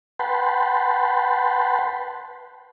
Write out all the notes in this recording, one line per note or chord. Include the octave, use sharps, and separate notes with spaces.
B4 F#5 G5 A5 B5 C6